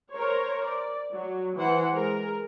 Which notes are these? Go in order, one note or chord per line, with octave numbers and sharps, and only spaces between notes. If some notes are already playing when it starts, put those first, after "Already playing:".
A#4 C5 C#5
D5
F#3
E3 C5 F#5 B5
G#3 A#4